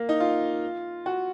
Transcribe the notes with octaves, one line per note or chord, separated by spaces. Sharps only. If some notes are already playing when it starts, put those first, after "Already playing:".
Already playing: A#3
D#4
F4
F#4